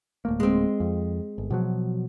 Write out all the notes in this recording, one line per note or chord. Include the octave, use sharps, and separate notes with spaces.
D1 A3 A#3
G#3 C4
F2
G1
B2 F3 F#3